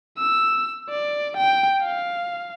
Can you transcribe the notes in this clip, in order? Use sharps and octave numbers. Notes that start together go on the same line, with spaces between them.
E6
D5
G5
F5